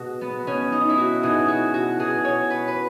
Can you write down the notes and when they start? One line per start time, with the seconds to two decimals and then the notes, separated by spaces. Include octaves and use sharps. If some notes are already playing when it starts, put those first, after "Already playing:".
Already playing: B2 F#4 G#4
0.21 B3
0.47 B2 C#4
0.72 D#4
0.90 E4
0.98 F#4
1.23 B2 G#4
1.48 F#4
1.74 F#4
1.99 B2 G#4
2.24 C#5
2.50 B4
2.68 B4